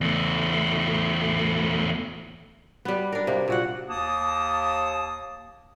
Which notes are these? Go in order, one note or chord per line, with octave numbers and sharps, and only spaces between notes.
E2 A3
G3 B3
D4 A#4
C3 A#3
A#2 F#4 F#5
D#2 A#3 A5 D#6